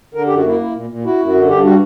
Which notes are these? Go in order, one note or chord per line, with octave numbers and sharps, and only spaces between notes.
D3 A#4
F#2 G4
F#4
A#3 E4
E4
A#2
A#2
E4 F#4
F#2
F#4
D3
G2 G4
G3 F#4